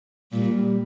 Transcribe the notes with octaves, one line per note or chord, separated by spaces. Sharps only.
A#2 G3
G3